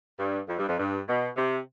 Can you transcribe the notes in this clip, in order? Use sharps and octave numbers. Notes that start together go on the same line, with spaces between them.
G2
F2
G2
F2
G2
B2
C3